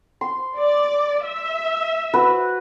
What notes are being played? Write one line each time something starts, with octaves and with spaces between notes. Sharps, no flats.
C6
D5
E5
F#4 B4 F#5